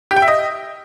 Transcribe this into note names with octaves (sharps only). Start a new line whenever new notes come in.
G4
G5
E5
D#5